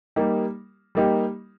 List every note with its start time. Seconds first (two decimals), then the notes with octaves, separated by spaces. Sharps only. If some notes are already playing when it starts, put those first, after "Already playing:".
0.16 G3 A#3 D#4 G4
0.95 G3 A#3 D#4 G4